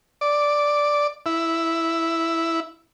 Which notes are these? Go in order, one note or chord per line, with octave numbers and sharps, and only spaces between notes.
D5
E4